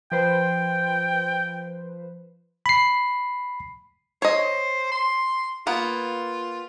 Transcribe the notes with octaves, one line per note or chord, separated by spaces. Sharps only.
F3 B4 C5 G5
B5 C7
C5 C#5 D#5
C6
A#3 B3 F4